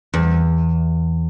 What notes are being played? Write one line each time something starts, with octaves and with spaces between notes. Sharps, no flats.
E2